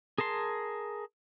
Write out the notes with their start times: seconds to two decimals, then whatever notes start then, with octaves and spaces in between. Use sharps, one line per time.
0.18 G#4 A#4 A5 C6